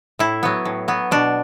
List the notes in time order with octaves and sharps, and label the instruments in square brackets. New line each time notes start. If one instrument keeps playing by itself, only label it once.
[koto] A2 E4
F#3 B3
A2
F#3 B3
B2 D4